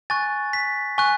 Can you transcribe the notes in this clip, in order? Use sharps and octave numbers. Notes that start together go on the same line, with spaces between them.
G#5 C#6 F#6 A6
B6
G#5 C#6 F#6